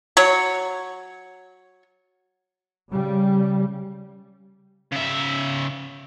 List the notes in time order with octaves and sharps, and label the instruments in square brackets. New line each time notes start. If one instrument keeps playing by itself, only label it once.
[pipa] F#3 C#5
[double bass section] C#3 G3
[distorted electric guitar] C#3 E5